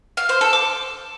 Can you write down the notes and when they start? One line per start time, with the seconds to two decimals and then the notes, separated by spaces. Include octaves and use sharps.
0.17 F5
0.29 C5
0.41 A4
0.53 D6